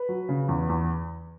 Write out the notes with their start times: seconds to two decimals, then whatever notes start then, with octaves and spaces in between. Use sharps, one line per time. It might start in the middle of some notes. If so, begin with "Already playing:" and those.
Already playing: B4
0.09 F#3
0.29 C#3
0.49 E2
0.69 E2